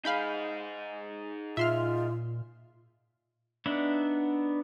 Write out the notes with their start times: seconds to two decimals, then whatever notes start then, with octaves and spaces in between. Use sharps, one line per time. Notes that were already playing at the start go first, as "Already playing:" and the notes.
0.05 D#4 G#4 F5 B5 G6
1.57 A#2 F4 E5 C6 F6
3.66 B3 D4 D#4 E5 F#5